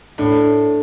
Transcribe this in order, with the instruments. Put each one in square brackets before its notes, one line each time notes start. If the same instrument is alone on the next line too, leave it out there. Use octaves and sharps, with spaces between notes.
[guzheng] A2 [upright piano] D4